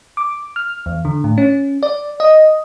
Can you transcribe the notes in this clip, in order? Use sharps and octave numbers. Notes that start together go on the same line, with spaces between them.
D6
F6
E2
D3
A2
C#4
D5
D#5